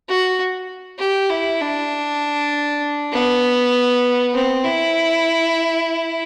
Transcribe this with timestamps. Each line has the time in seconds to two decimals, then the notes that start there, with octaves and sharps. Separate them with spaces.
0.09 F#4
0.99 G4
1.30 E4
1.61 D4
3.12 B3
4.34 C4
4.64 E4